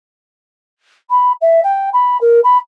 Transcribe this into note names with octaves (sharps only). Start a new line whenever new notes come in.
B5
E5
G5
B5
A#4
B5